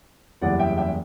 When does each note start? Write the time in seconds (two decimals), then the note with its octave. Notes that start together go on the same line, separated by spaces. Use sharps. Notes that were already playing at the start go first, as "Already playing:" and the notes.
0.42 F#1 E2 C#3 E3 G3 D5 F#5
0.59 E5 G5
0.77 E5 G5